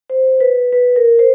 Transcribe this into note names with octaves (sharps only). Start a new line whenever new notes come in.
C5
B4
B4
A#4
C5